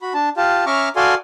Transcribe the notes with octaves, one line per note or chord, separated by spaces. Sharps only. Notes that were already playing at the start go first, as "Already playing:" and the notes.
F#4 B5
D4 A5
F4 G4 F5 A5
C#4 E5 A#5 C#6 D6 F6
F#4 A4 D5 F5 G#5 C6